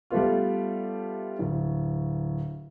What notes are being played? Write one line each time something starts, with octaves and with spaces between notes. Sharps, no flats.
G3 A3 B3 F4
D1